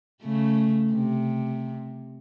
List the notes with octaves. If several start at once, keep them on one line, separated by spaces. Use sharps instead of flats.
C#3 A3
C3